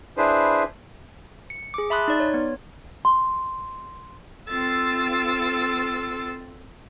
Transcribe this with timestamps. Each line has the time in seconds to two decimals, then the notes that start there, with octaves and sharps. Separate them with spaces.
0.18 D4 E4 G#4 B4 C5
1.50 C#7
1.74 G#4 D6
1.90 E5 A5 B5 C6 D#6 F#6
2.08 D#4 D5
2.20 C#5
2.34 B3
3.05 C6
4.48 C4 F4 A4 E6 A6